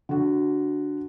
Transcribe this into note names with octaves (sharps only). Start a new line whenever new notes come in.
D3 F#4